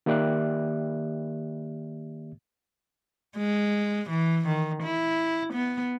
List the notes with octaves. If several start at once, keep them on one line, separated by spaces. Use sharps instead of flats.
D#3 A#3 G4 D5 E5 F#6
G#3
E3
D#3
E4
B3